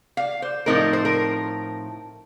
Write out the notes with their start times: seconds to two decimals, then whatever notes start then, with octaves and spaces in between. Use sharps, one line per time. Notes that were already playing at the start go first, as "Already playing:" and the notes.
0.17 F5
0.42 C5
0.66 A2 F3 C4 D#4 A#4
0.93 C5
1.05 A#4